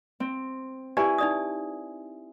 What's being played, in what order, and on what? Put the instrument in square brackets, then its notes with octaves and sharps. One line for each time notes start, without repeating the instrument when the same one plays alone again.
[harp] C4
[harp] E4 G#5 [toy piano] G4 B4 D5
[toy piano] D#4 D5 D#6